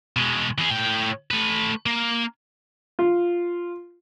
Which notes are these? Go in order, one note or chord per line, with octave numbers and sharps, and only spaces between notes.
B2 G#3
E3 G#4
A2 G5
A3 B4
A#3
F4